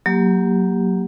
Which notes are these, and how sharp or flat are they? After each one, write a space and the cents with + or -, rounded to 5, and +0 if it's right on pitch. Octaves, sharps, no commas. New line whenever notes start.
F#3 +0 A#3 +0 G4 +0